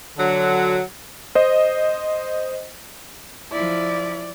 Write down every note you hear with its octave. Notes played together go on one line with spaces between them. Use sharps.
D3 F#3
C5 D#5
F3 E4 D5